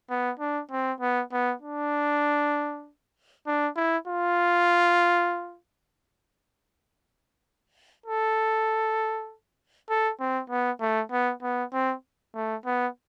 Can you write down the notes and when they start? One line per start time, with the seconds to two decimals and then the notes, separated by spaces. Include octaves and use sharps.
0.10 B3
0.40 D4
0.71 C4
1.01 B3
1.32 B3
1.62 D4
3.47 D4
3.76 E4
4.07 F4
8.06 A4
9.90 A4
10.20 C4
10.50 B3
10.80 A3
11.12 B3
11.42 B3
11.73 C4
12.34 A3
12.65 B3